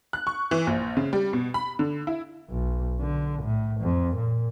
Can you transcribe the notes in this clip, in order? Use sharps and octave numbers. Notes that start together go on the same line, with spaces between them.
F#6
C#6
E3
A#1
C#3
G3
B2
B5
D3
E4
B1
D3
A2
F2
A#2